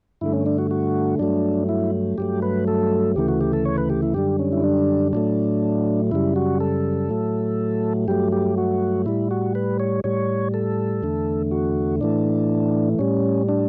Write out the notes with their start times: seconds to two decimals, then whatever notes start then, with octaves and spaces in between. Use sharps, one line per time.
0.21 G2 D3 A3 E4
0.33 C#4
0.46 D4
0.58 F#4
0.71 F#4
1.19 G2 F#3 A3 D4
1.69 E4
2.18 G2 F#3 A3 G4
2.42 B4
2.68 A4
3.16 D2 C#3 E3 A3 G4
3.28 F#4
3.41 G4
3.53 A4
3.65 C#5
3.78 B4
3.90 G4
4.02 E4
4.14 F#2 D3 G3 G4
4.39 C#4
4.52 E4
4.64 D4
5.13 A2 F#3 A3 D4
6.11 F#2 C#3 G3 E4
6.36 F#4
6.60 A4
7.09 A2 F#3 A3
8.08 G2 F#3 A3 G4
8.32 G4
8.58 F#4
9.06 A2 G3 E4
9.31 F#4
9.55 B4
9.80 C#5
10.04 A2 G3 C#5
10.54 A4
11.03 E2 D3 A3
11.51 F#4
12.01 A2 E3 A3 D4
12.99 A2 G3 C#4
13.49 D4